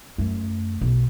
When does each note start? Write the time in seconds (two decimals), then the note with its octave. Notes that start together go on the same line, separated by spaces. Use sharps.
0.18 F#2 A3
0.81 B1